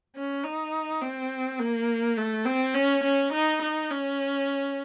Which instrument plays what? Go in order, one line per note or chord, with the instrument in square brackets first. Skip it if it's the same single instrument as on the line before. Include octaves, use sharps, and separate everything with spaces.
[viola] C#4
D#4
C4
A#3
A3
C4
C#4
C#4
D#4
D#4
C#4